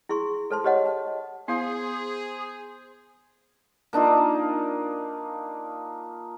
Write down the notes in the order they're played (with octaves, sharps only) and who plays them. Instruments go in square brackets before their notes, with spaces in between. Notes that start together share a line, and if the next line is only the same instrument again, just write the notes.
[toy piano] E4 G#4 C6 C#6
A4 C5 A5 C6
G4 C5 C#5 D#5 F#5
A5
[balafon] B3 E4 F5 [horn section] G#4 [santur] C5 C6
[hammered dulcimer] A#3 D4 D#4 F4